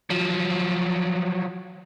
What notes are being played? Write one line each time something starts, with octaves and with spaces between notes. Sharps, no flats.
F3 F#3